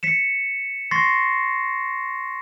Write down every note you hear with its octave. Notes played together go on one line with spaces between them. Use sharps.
B6 C#7 E7
C6 C#6 A6 A#6 C7